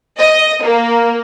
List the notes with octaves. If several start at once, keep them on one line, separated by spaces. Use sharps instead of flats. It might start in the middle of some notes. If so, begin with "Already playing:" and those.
D#5
A#3